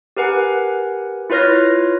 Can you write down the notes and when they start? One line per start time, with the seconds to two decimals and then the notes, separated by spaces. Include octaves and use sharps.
0.17 G4 A#4 B4 F#5 G#5
1.30 E4 F4 B4 C#5 F6 A#6